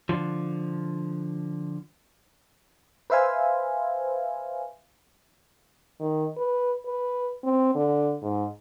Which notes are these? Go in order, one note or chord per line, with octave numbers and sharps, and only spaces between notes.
D3 F3
B4 C5 E5 F5 G#5
D#3
B4
B4
C4
D3
G#2